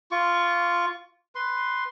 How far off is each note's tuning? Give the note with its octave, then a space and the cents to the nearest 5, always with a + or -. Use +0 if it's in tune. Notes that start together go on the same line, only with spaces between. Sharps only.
F4 -5 C#6 +15
B4 +10 C6 +0